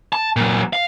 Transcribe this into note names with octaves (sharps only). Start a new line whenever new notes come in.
A5
A#2 F#3
F5